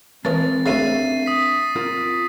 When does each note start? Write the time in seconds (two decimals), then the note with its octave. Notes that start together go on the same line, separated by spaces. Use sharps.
0.25 E3 G#3 C4 C#4 A#4 A5 A6
0.66 D2 C#3 D4 A#4 E5 A6 C7 D#7
1.26 D#6 B6
1.76 C4 F4 A#4